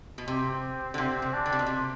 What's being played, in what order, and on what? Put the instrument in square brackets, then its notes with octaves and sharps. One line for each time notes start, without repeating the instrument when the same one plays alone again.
[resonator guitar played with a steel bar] B2
[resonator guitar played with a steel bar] C3 [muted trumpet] C4
[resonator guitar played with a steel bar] D3
[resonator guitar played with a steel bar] C3 [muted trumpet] C4
[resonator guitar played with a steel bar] C3
[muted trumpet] D4
[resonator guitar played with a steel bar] D3
C3
B2
C3